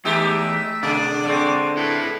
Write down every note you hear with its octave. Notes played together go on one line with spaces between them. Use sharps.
E2 G#3 A3 D#4 G4 E5
B2 D3 D4 G#4 D5
D3 G#3 A3 C4
E4 A4 B4